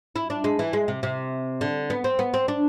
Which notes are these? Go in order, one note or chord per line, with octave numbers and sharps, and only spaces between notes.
E4
D4
G#3
E3
G#3
C3
C3
D3
B3
C4
B3
C4
D4